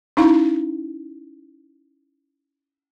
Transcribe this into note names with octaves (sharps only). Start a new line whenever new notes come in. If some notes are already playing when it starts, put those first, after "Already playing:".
C#4 D#4 E4 F5 C6